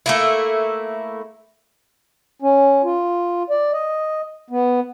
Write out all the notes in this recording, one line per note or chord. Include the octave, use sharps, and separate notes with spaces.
A3 A#3 E4
C#4
F4
D5
D#5
B3